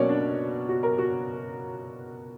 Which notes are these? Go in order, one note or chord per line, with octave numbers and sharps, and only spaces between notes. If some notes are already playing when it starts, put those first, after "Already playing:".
Already playing: B2 F#3 A#3 C#4 C#5 D5
D4
F#4
A#4
F#4